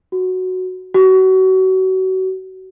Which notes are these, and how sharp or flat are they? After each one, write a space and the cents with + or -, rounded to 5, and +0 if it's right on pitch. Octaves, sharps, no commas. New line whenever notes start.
F#4 +0
F#4 +30